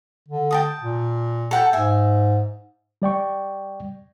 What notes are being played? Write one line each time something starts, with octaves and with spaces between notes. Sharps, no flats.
D3
G5 A5 D#6
A#2
A4 F#5 G5
G#2 E5 G#5
G3 D5 G5 C#6